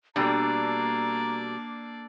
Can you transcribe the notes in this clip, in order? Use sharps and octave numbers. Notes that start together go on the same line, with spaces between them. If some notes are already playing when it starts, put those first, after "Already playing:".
B2 G3 A#3 D4 A4 D5 A#5